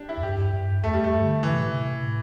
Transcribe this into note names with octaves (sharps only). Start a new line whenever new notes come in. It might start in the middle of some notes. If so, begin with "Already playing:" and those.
Already playing: D4 G4
E4
E2
G2 G4
G2
E2 A3
G3
G2 A3
D3
D3 E3
C3
A2
C3
A2